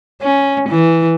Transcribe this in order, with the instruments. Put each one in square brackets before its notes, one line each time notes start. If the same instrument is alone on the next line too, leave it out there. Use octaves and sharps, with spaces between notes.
[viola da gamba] C#4
E3